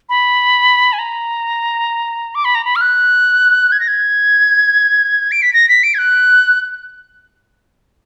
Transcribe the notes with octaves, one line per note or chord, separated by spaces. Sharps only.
B5
G#5
A#5
D6
B5
A#5
B5
F6
F#6
G#6
A#6
G#6
D7
B6
A#6
B6
D7
G#6
F#6